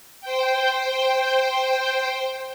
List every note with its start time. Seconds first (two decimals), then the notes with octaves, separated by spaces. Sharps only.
0.21 C5 G5